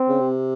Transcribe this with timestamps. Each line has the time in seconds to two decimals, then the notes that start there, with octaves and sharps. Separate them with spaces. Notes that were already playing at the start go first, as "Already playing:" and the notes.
Already playing: C4
0.08 C#3
0.20 C3